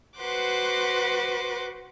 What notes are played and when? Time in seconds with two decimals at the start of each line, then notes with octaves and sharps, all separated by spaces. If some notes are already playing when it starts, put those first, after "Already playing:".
0.18 F#4 B4 C5 F#5 C6 D6